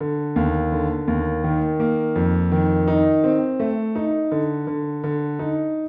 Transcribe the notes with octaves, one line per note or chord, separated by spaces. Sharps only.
D3
D#2
D3
D#2
D#3
A#3
F2
D#3
D#4
C4
A3
D#4
D3
D3
D3
D#4